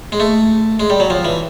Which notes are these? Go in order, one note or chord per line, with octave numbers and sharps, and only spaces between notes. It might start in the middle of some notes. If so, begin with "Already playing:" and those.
G#3
A3
G#3
G3
F#3
F3
E3